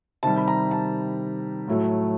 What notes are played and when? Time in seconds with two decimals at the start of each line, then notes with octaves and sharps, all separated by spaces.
0.23 C3 D#3 G3 A5
0.38 B5
0.48 A#5
0.71 A5
1.68 A2 F#3 A3